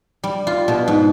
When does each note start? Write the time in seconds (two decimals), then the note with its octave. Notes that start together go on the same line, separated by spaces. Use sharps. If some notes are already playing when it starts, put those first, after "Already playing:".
0.24 G3
0.47 F4
0.68 B2
0.88 G#2